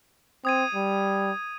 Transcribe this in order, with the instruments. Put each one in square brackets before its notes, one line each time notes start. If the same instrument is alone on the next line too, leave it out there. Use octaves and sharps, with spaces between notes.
[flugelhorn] C4 [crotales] D#6 G#6 D#7
[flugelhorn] G3